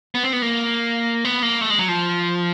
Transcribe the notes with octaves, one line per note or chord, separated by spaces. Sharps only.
B3
C4
B3
A#3
B3
A#3
A3
G#3
F#3
F3